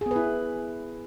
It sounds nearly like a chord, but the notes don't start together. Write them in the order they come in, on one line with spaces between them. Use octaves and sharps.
G#4 B3 B4 E4